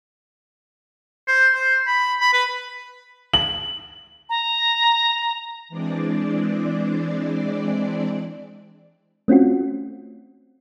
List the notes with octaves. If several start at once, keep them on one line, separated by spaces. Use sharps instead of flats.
C5
C5
B5
B5
B4
F#7
A#5
E3 G#3 C4 D4 D5
A3 C4 C#4 F4 F#4